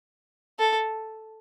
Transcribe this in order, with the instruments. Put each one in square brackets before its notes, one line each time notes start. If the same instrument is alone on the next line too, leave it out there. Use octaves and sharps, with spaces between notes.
[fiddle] A4